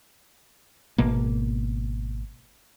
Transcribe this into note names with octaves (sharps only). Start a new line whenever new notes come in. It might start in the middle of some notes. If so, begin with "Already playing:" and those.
G#1 B2 A#3